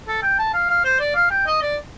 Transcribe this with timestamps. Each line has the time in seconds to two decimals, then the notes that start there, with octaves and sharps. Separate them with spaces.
0.08 A4
0.23 G5
0.39 A5
0.54 F5
0.69 F5
0.84 C5
1.00 D5
1.15 F5
1.31 G5
1.47 D#5
1.62 D5